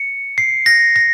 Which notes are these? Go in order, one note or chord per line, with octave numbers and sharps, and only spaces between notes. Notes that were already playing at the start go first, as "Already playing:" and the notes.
Already playing: C#7
C7
A#6
A#6